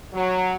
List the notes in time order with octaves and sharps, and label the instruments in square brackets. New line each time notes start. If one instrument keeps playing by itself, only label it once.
[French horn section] F#3